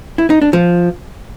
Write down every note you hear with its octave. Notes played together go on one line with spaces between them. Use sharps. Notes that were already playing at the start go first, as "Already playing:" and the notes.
E4
D#4
D4
F3